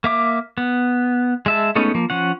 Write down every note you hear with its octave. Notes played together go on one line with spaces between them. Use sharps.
A#3 E5 D6
B3
G#3 E5 A5
G#3 A3 B3 C#4 D#4
F3 A#3
F3 C#4 F#5